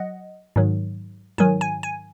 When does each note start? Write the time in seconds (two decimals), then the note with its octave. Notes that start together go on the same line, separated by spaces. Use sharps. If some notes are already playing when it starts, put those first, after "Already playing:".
Already playing: F#3 D#5 F#5
0.56 G#2 D#3 F#3
1.38 G#2 D#3 F#3 G#5
1.61 G#5
1.83 G#5